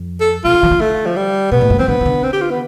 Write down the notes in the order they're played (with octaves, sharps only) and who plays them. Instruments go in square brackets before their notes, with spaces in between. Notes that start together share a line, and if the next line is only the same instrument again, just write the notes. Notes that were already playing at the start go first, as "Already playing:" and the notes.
Already playing: [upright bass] F2
[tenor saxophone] A4
[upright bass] C3 [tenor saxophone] F4
[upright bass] D3
E3
D3
[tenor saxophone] A3
F3
G3
[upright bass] B2 [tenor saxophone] B3
[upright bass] A2
G2
[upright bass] E3 [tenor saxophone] C4
[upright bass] D3 [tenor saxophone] B3
[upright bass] E3
D3
[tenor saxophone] C4
G4
F4
B3